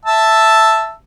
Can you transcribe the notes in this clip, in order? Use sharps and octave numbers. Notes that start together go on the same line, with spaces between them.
E5 A5 E6